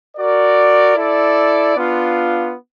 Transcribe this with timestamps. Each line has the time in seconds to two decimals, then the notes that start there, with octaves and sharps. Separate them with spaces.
0.16 F#4 A#4 D5
0.96 E4 A4 D5
1.76 B3 D4 F4